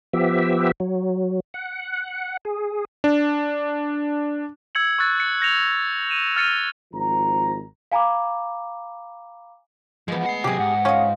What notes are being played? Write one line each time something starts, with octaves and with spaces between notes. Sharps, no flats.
F3 B3 G4 E5
F#3
F#5
G#4
D4
E6 G#6 C#7 F#7
C#6 E6 F#6 A6
C#7
G6 A#6 C#7 F7
D#7 E7
F6 A6 C#7 D#7 F7
G#1 F3 A#5
F5 G#5 A#5 B5 D6
E3 F3 G#3 B3
A3 F#5 C7
C3 F#3 G4 G#4
G#2 F#5
C#4 F4 D#5